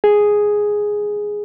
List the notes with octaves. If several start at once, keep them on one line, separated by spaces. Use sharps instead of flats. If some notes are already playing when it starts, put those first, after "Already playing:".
G#4